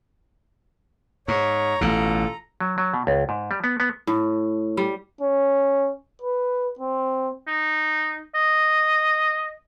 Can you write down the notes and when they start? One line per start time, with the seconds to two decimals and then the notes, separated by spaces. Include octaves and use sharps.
1.28 G#2 C#5 A#5
1.81 A1 B2 F4 A4
2.60 F#3
2.78 F#3
2.94 B2
3.07 C#2
3.29 G#2
3.51 G3
3.64 B3
3.80 B3
4.07 A2
4.77 G3
5.21 C#4
6.21 B4
6.79 C4
7.47 D#4
8.35 D#5